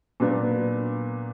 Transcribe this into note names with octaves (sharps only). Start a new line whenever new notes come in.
A#2 F#3 B3 D4